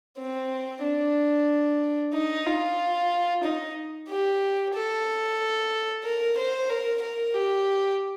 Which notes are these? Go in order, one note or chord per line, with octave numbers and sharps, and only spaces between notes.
C4
D4
D#4
F4
D#4
G4
A4
A#4
C5
A#4
A#4
G4